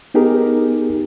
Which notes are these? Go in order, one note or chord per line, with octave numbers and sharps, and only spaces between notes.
B3 D#4 G4 G#4 A#4